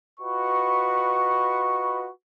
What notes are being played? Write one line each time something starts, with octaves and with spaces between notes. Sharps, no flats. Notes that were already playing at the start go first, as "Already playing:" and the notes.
F4 F#4 B4 D#5 B5 C#6